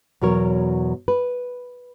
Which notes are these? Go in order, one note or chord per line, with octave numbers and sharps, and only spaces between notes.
E2 B2 F#3 A#4 C#5
B4